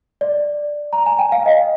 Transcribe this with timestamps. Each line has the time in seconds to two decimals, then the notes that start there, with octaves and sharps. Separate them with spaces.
0.21 D5
0.93 A#5
1.06 G#5
1.19 G5
1.32 F5
1.46 D#5